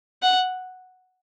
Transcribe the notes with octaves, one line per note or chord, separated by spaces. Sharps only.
F#5